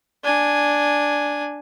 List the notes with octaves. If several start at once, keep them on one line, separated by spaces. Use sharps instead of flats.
D4 G#5